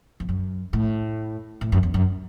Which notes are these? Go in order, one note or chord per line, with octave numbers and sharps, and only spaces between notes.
E2
F#2
A2
A2
F#2
E2
F#2